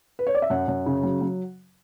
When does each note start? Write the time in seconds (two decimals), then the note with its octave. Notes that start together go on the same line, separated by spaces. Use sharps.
0.19 B4
0.27 C#5
0.35 D5
0.42 E5
0.50 F#2 F#5
0.68 F#2
0.86 C#3
1.03 F#3
1.21 F#3